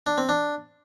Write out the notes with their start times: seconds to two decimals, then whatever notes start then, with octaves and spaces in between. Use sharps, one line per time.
0.07 D4
0.18 C4
0.29 D4